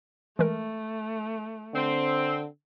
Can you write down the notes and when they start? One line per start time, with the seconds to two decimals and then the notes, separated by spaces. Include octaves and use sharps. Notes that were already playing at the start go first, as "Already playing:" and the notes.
0.39 E3 G#3 A3 A#4
1.74 D3 C4